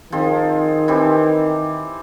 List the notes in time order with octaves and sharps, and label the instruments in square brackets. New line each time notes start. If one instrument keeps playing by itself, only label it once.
[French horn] D#3 [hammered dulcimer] F3 C4 G#4
[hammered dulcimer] E3 C4 G4